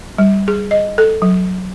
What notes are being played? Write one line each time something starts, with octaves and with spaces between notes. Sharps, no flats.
G3
G#4
D#5
A4
F#3